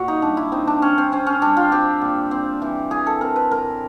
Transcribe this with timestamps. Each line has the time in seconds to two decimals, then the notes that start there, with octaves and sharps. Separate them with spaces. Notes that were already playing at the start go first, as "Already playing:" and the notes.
Already playing: A#2 F#4
0.08 D#4
0.22 G3 D4
0.37 E4
0.52 C4 D#4
0.67 D4
0.82 C4 C#4
0.98 C4
1.12 C4 C#4
1.27 C#4
1.42 G3 D4
1.57 F4
1.72 C4 G4
2.01 A#2
2.31 C4
2.62 E3
2.91 E3 G#4
3.06 A4
3.21 C4 A#4
3.36 B4
3.51 A2 A#4